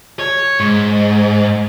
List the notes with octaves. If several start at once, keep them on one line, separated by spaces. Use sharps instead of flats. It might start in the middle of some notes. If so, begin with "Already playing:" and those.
C#5
G#2